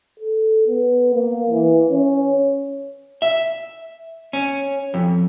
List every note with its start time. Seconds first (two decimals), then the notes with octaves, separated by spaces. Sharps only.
0.19 A4
0.67 B3
1.14 A#3
1.50 E3
1.91 C#4
3.22 E5
4.33 C#4
4.94 F2